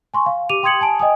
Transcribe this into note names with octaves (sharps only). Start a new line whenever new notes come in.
G#5 C6 C#6
F5
G4 D6 D#7 F7
G5 C6 D#6 G#6 C#7 F#7
G#5 A5 D7
D#5 G5 G#5 D#6